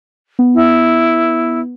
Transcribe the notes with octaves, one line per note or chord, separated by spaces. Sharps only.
B3
E4